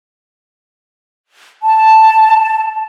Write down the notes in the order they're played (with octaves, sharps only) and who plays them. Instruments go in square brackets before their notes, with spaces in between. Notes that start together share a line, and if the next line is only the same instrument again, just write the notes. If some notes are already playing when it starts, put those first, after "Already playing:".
[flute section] A5